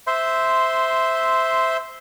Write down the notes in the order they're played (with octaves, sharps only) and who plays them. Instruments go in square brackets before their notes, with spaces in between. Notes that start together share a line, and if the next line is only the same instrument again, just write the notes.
[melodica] C5 E5 C6